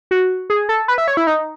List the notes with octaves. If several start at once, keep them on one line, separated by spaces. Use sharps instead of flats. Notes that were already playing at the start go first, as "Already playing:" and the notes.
F#4
G#4
A4
B4
E5
C#5
E4
D#4